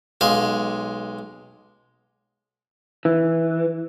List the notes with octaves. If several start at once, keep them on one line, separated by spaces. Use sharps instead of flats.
B1 G#3 F5
E3